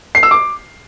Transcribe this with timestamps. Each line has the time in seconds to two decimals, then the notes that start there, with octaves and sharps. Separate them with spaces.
0.15 C7
0.23 E6
0.31 D6